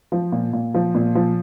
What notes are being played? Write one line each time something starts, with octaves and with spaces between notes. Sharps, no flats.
F3
A#2
A#2
F3
A#2
F3